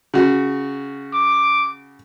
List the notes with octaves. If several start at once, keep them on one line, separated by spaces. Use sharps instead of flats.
C#3 F#4
D6